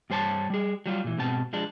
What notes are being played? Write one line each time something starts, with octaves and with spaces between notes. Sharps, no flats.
G2 G3 C5 C#5 A5
G3 G#4
F#3 G3 F4
A#2 E3
G#2 B2 C4 A5
F3 G#3 D4